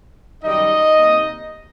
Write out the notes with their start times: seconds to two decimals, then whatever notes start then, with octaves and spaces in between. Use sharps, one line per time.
0.44 F#2 D#3 G3 D#4 D#5
0.96 C3 G3 A#3